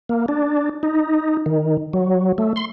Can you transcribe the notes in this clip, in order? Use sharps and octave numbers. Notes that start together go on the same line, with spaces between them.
A#3
D4
D#4
D#3
F#3
A3
C6